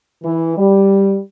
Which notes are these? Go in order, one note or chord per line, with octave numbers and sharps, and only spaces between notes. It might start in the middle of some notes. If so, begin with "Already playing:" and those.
E3
G3